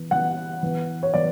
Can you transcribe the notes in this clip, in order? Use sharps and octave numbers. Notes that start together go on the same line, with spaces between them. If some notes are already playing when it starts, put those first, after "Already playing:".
Already playing: E3 B3
E3 B3 F#5
E3 B3
C#5
E3 B3 D5